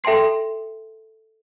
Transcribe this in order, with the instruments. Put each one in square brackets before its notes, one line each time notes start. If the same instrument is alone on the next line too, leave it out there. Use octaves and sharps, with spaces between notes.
[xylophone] A4 E5 G5 A5 C6 C7